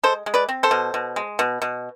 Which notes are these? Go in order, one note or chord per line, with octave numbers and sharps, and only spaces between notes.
G#3 A4 C5
G#3
B4 D5
C4
A4 C5
B2
B2
G#3
B2
B2